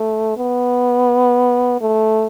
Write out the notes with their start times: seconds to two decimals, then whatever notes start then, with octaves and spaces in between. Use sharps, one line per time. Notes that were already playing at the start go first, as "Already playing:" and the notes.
Already playing: A3
0.37 B3
1.81 A3